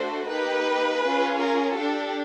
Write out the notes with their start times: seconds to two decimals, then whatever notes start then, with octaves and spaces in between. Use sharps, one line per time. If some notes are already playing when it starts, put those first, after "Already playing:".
Already playing: A3 D4 F#4 A4 C5
0.30 A#3 D#4 G4 B4
1.03 C#4 F4 G#4
1.41 A#4
1.78 D4 G4 A4